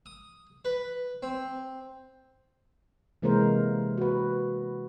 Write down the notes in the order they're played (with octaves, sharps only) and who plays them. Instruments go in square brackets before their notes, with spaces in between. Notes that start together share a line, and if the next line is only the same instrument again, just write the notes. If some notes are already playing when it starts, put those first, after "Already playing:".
[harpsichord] D#6
B4
C4
[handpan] C3 E3 G#3 A#3 A#4 C5
F#4 B4